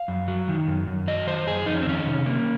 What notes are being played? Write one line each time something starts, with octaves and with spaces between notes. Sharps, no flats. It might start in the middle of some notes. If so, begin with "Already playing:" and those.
Already playing: F5
F#2
F#3
D#3
F#2
F#2
F#3 D#5
D#3 C5
F#2 G#4
F2 D#4
C#4
C4
D#3 C#4
C3
A#3